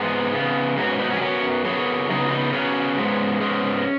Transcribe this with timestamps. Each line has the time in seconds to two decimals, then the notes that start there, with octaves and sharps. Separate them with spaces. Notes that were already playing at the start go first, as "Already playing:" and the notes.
Already playing: G#2 G#3 B3 D#4
0.33 C#3 B3
0.77 G#2 F#3 B3 C#4 F#4
0.89 C#4
0.99 B3 D#4
1.10 C#4 F#4
1.16 G#4
1.21 F#2 F#3 B3 C#4 F#4
1.65 F#2 C#3 F#3 B3 G#4 C#5
2.10 C#3 B3 D#4 G#4
2.26 F#4
2.31 B3 D#4
2.53 C#3 F#3 B3 C#4
2.97 G#2 G#3 B3
3.41 G#2 G#3 B3 C#4